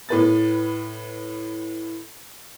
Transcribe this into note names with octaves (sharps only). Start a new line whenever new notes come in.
A2 B4 A6